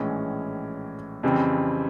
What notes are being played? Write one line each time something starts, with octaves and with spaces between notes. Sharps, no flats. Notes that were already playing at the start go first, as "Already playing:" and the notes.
Already playing: A#1 A2 E3 G#3 C#4
F2 C#3 E3 G3 C4